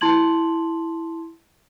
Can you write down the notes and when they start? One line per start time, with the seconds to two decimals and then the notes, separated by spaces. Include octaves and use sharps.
0.01 E4 A5 C6 G#6 F#7